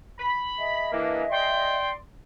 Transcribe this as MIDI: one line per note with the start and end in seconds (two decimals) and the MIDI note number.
0.19 0.87 83
0.57 1.75 68
0.57 1.75 75
0.57 1.75 76
0.92 1.23 52
0.92 1.23 58
0.92 1.23 62
1.31 1.96 74
1.31 1.91 79
1.31 1.96 84